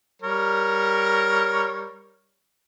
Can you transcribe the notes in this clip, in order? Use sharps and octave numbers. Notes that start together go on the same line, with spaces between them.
G3 A#4 C#5